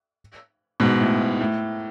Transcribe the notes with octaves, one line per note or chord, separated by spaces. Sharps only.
G#2 B2
A2
A2